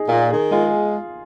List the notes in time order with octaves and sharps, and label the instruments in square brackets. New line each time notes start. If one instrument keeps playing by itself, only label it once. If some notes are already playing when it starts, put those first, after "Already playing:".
Already playing: [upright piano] D#4 G#4
[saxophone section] A#2 [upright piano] A#4
[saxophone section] D#3 [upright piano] G#4
[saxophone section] G#3 [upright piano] F4